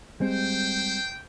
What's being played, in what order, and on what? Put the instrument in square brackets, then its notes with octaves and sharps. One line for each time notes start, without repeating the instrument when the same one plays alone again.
[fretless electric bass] G3 G#3 C4 [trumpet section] C5 G5